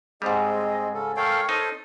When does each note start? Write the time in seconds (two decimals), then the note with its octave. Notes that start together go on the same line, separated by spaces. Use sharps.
0.22 G#2 G3 G#3 C4 G#4 D#5
0.94 C#3 C#4 A4
1.17 A4 A#4 C#5 F5 G5 C#6
1.49 D#4 A4 C5